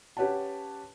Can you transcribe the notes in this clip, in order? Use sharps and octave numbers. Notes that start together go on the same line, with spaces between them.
C#4 G4 B4 C#5 F#5 A5